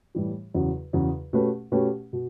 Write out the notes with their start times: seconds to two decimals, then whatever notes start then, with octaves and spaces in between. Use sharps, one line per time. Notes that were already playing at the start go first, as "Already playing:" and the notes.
0.15 A2 E3 G3
0.54 E2 C#3 F#3
0.93 E2 C#3 F#3
1.33 B2 A3 C#4 G4 B4
1.72 B2 A3 C#4 G4 B4
2.13 B2